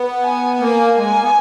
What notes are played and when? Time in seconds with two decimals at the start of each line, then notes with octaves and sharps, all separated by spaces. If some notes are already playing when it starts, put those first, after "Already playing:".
Already playing: B3
0.23 G#5
0.60 A#3 G#5
0.98 G#3 G#5
1.10 A#3
1.22 B3